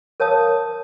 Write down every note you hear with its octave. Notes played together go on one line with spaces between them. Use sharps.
A#4 C#5 F5 A5 D#6